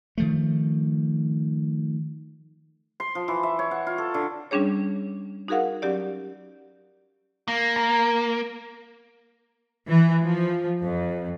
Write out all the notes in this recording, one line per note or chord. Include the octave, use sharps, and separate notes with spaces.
D#3 F3 A3
C6
F3
E3
E5
C#5
F#5
F4
A4
D3
G3 C#4 D4 G#4 C#5
D#4 F#4 G#4 A#4 F5 F#5
F#3 C#4 G4 D5
A#3
A#5
E3
F3
F2